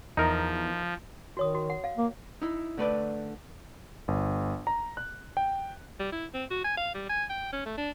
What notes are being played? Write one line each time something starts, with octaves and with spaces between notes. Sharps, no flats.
E2 F3 D#4 A#4
D#3 F#4 C#5 D#6
F#4
F#5
F5
A#3
D#4 E4
D3 A3 B4 D5
G1
A#5
F#6
G5
G3
E4
C4
F#4
G#5
F5
G3
G#5
G5
C#4
A3
D4